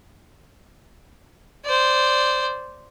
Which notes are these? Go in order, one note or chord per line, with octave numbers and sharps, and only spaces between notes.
C5 D5